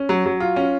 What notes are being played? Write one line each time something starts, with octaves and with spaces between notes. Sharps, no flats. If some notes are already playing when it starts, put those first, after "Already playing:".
Already playing: C#4
F#3
F#3
F4
C#4